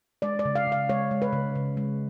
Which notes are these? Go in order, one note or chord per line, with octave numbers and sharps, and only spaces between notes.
G#3 D5
D5
C#3
F5
C#3
F5
G#3 C#5
G#3
B4
C#3
C#3
G#3